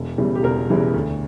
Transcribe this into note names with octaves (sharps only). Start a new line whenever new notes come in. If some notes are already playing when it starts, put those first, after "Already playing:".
Already playing: E1
E2 C#3 E3 G3
G4
E1 A#4
E2 C#3 E3 G3
D2